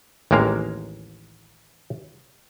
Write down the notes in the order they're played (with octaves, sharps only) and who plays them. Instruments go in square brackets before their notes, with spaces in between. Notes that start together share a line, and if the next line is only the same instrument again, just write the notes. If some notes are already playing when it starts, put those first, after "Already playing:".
[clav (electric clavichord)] A1 D#2 G#3 A#3 F5